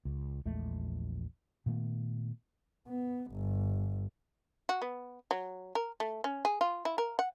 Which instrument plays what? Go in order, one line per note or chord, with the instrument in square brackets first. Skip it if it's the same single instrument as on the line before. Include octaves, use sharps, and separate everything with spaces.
[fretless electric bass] C#2
A#1 E2 G#3 A3
A#2 D#3 A3 B3
[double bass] B3
G1
[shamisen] F#4
B3
F#3
A#4
A3
C#4
G#4
F4
E4
A#4
F#5